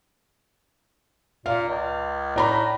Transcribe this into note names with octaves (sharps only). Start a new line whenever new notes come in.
A#2 F5
C#2
A2 D5 A#5 B5